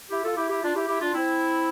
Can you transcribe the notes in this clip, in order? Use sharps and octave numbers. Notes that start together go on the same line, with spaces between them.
E4 G4
F4 A4
E4 G4
E4 G4
D4 F4
E4 G4
E4 G4
D4 F4
C4 E4